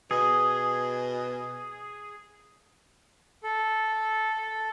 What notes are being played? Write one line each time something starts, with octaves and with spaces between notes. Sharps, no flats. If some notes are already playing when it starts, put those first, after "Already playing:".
B2 G#4
A4